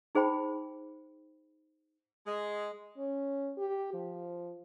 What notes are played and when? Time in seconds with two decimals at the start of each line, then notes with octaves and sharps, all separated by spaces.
0.15 D#4 G#4 C5 G5 B5
2.26 G#3
2.98 C#4
3.58 G4
3.94 F3